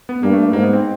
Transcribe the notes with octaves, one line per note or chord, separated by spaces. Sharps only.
B3
G2 A#3
A3
A#3
G#2 A#3
B3
C4